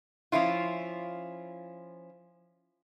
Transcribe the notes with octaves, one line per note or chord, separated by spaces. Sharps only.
F3 C#4 E4 F4